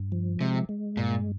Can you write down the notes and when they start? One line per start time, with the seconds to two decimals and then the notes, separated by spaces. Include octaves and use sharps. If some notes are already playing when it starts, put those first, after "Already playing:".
Already playing: G2
0.12 F3
0.41 C3 G#3
0.69 G#3
0.97 G2 A#2